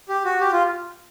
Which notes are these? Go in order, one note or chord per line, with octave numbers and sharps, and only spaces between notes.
G4
F#4
G4
F4